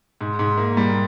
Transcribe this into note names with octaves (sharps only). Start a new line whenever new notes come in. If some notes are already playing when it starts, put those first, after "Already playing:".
G#2
G#2
A#3
G3